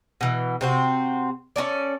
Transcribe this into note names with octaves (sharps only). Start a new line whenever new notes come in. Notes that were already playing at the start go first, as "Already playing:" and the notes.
B2 E3
C3 C4 F#4
C#4 D#4 A4 D5